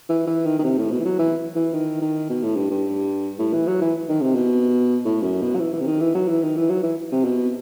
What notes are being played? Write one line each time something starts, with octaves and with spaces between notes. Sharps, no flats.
E3
E3
D#3
D#3
C3
A2
B2
E3
F#3
E3
E3
D#3
D#3
B2
A2
G2
G2
A2
E3
F#3
E3
D#3
C3
B2
A2
F#2
B2
F#3
E3
E3
C3
D#3
E3
F#3
E3
D#3
E3
F#3
E3
C3
B2